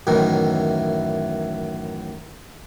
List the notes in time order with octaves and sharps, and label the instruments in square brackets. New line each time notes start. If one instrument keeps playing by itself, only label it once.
[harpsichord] F#2 A2 D#3 E3